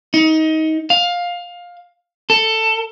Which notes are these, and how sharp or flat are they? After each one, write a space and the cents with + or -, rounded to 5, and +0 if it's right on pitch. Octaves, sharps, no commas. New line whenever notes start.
D#4 +25
F5 +15
A4 +15